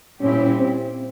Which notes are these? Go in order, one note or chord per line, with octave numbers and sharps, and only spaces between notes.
A#2 G3 C4 C#4 E4 G4
C4